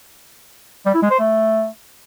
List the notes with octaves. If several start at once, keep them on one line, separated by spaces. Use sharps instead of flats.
G3
E4
G#3
C5
A3